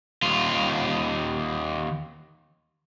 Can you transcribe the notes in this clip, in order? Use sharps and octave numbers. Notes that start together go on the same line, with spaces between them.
D#2 F4